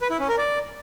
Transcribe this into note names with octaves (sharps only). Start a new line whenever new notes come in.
B4
E4
C#4
A#4
D5